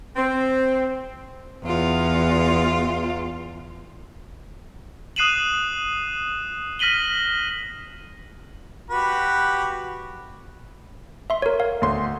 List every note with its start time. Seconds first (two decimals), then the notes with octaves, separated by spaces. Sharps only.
0.16 C4
1.63 E2 F4
5.16 D#6 F#6 C7 D#7 E7 F#7
6.79 F6 A#6 B6 D#7 F#7 G7
8.90 F#4 G4 B4
11.30 E5 C6
11.42 A#4 C#5
11.60 F5
11.82 D2 C6